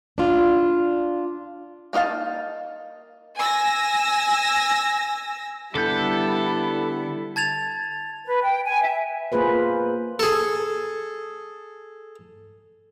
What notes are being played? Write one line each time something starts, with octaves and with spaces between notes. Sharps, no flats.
D4 F4
A#3 D#4 F#4 F5 A5
G#5 E6 A#6
D3 G3 B3 E4 A4 G6
A5 G#6 A6 F7
B4
G5
G#5
E5
A#3 F4 G#4 B4 C5
G#4 A4